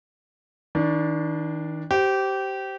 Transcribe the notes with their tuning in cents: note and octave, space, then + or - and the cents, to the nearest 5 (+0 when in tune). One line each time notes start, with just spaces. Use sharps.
D#3 +40 D4 +0
G4 -20 C5 +0